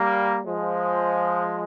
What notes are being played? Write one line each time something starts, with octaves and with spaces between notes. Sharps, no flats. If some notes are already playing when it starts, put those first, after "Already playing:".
Already playing: G3 A#3
F3 G#3